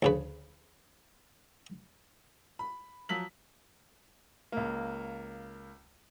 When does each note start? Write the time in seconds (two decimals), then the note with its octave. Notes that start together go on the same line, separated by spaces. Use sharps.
0.02 D2 C#3 B4
2.59 B5
3.09 F3 F#3 B6 F#7
4.52 C#2 A#3